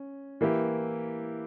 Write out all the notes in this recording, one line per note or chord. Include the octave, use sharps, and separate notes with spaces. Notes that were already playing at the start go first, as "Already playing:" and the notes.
Already playing: C#4
E3 A#3 E4 G4